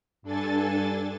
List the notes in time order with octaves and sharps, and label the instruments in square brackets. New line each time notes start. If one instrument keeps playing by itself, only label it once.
[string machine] G2 D4 A4 G#5 A6